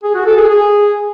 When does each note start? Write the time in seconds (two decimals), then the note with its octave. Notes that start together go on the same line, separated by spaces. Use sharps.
0.04 G#4
0.15 F#4
0.26 A4
0.37 G#4
0.48 G#4